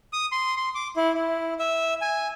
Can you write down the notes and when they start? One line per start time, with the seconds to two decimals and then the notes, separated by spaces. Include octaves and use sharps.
0.13 D#6
0.32 C6
0.57 C6
0.75 D6
0.96 E4
1.15 E4
1.59 E5
2.01 G#5